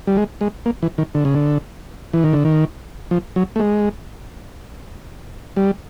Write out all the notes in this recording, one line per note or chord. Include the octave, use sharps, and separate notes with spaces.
G3
G#3
G#3
A#3
E3
D#3
D3
C#3
D3
E3
D#3
D3
D#3
F3
F#3
A3
G#3
G3